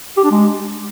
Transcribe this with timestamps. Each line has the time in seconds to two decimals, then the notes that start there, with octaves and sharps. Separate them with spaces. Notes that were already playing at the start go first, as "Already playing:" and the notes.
0.17 G4
0.24 D4
0.31 G#3